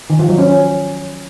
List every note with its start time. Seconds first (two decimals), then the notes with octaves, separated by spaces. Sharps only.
0.10 D#3
0.19 F3
0.29 F#3
0.38 C#4